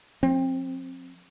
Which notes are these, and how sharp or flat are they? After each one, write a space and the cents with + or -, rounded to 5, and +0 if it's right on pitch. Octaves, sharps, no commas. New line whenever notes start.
F3 +30 C4 +20